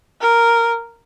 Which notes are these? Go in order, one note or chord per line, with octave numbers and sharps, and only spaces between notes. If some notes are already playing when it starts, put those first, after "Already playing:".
A#4